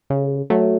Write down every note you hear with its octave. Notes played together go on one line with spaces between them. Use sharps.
C#3
F#3 A3